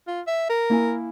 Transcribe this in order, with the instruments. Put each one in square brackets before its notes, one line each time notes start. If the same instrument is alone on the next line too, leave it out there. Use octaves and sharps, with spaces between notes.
[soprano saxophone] F4
E5
A#4
[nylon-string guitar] A#3 E4 G#5